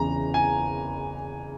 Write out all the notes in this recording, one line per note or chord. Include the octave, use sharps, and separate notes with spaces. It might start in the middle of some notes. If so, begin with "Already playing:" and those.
Already playing: E2 C#3 E3 A#5
G#5